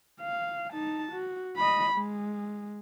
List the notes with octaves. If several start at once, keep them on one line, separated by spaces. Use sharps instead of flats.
F5
D#4 A5
F#4
D#5 B5
G#3